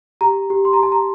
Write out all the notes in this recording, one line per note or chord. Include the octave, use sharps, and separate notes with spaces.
G4 A#5
G4
C6
A#5
G4 A5
A#5